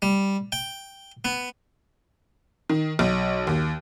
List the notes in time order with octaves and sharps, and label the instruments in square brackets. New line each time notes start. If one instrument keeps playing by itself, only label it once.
[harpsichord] G3
G5
B3
[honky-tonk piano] D#3
B1
D#2